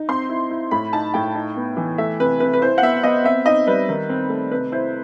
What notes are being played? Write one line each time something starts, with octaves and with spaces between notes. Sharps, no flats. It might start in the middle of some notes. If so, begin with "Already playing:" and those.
Already playing: D#4
C4 C6
E4
E4
A2 B5
D#4 A5
A2 G5
D#4
B3
E3
A3 E5
C3 B4
C3 B4
B4
E4 C5
F#5
B3 E5
B3 D#5
C4 E5
D#4 D#5
G3 B4
D#3
C4
A3
C3 B4
E4 C5